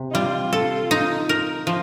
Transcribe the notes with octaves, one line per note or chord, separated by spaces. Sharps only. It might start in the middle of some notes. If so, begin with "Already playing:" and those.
Already playing: C3
D#4
G3 F4
A4
D#4
A#4
F3 F4